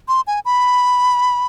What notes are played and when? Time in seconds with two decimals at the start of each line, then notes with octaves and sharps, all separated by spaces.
0.08 C6
0.27 G#5
0.45 B5